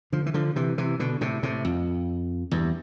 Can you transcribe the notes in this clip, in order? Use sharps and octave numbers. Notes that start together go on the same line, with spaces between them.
D3 F3
E3
D3 F3
C3 E3
C3 E3
B2 D3
A2 C3
A2 C3
F2
E2 G2